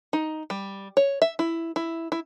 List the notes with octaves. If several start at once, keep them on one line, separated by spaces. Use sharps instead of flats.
D#4
G3
C#5
E5
E4
E4
E4